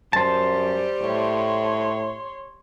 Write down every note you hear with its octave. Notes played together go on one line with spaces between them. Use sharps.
F#2 G3 C5 A5
A2 C#5 C6